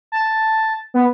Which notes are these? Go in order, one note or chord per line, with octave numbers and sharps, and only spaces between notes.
A5
B3